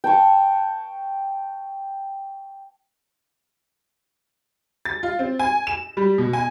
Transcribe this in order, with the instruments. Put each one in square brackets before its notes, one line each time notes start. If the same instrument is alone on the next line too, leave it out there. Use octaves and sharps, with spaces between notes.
[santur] G5 A5 C#6
[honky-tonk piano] A6
F4
C4
G#5
E7
G3
B2
G#5